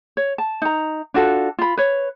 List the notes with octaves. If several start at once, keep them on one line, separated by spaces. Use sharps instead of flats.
C#5
A5
D#4 A#5
D4 F4 F#4 A4
F4 B5
B4 C#5